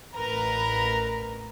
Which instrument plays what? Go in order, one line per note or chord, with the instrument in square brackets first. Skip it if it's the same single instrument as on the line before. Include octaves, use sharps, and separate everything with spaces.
[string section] A1 A#4 B4 A#5